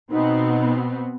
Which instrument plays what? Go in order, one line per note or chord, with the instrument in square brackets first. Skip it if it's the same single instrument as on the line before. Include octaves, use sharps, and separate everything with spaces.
[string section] B2 B3 C4 [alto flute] D#4